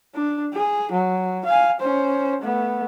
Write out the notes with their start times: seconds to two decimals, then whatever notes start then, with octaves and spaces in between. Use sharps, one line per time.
0.15 D4
0.54 G#4
0.92 F#3
1.45 F5 G#5
1.80 C#4 C5
2.41 A3 B3